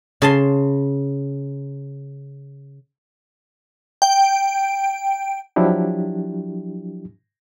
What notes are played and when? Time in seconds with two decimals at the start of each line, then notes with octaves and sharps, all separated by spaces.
0.22 C#3 A5 C6
4.02 G5
5.56 F3 F#3 D4 E4 G4